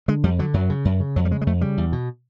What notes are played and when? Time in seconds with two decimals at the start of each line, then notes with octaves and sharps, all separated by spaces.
0.08 D3 G#3
0.24 F2 G3
0.39 D3 F#3
0.54 F#2 F#3
0.70 C#3
0.85 F#2
1.00 C#3
1.16 F2 F#3
1.25 G3
1.31 C#3 G#3
1.41 G#3
1.47 F2 A3
1.61 C#3 G3
1.77 E2
1.92 B2